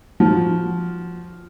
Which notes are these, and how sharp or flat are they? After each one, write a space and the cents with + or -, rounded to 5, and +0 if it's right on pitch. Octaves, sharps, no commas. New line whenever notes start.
F3 +0 F#4 +10